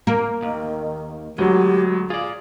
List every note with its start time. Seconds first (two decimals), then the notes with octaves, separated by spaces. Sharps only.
0.07 A#3
0.42 D#2 D#3
1.38 D2 F#3 G#3 G4
2.10 F4 G#4 D5 F5